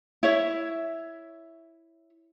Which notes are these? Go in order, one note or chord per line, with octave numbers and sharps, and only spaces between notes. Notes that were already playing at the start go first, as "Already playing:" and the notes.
E4 C#5 E5